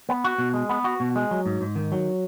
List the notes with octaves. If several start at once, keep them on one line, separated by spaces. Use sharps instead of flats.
B3
F#4
B2
G#3
B3
F#4
B2
G#3
F#3
G#2
G#2
D#3
F#3